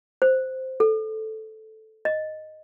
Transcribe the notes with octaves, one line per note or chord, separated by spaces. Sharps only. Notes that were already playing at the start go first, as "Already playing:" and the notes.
C5
A4
D#5